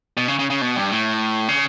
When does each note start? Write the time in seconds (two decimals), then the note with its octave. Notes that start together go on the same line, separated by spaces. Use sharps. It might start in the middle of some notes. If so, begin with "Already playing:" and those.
0.17 B2
0.28 C#3
0.39 C#3
0.50 C#3
0.62 B2
0.76 G2
0.91 A2
1.49 C#3